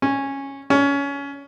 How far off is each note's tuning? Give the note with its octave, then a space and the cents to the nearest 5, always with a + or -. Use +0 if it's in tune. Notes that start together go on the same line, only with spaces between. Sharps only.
C#4 -10
C#4 +20